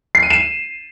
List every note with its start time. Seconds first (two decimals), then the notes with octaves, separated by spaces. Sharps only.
0.15 C7
0.23 D#7
0.30 E7